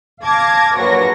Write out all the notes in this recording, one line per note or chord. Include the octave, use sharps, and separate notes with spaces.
F5 A5 D6 G#6 A#6
A#1 F#3 B4 C#6 A#6